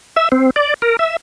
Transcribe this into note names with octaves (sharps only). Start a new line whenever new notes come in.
E5
C4
D5
A#4
E5